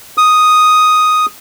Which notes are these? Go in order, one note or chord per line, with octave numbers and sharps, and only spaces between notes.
D#6